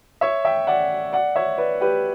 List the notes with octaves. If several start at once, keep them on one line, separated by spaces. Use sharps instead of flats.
C#5 E5
E5 G5
D5 F#5
D5 F#5
C#5 E5
B4 D5
G4 B4